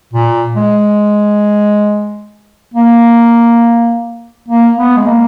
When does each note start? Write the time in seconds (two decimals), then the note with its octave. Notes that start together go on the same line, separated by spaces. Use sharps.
0.13 A#2
0.56 G#3
2.74 A#3
4.48 A#3
4.77 B3
4.97 G#3
5.06 A#3